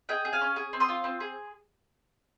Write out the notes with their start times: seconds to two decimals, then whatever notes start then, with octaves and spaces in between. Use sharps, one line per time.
0.09 G#4 D#5 G5
0.25 G#4
0.33 F5 G#5
0.41 C#4
0.56 G#4
0.73 C4
0.80 C6 D#6
0.89 F4
1.04 C4
1.20 G#4